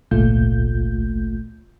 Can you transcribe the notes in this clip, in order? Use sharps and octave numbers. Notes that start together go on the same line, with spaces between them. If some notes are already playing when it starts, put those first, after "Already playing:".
G#1 C#2 A#2 A3 F4 G6